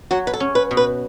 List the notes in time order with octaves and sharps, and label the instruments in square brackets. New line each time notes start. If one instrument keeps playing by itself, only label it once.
[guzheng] F#3 [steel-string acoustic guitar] F#4
[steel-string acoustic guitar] B4
A4
[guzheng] C#4
[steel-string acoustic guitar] B4
[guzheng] B2
[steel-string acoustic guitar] B4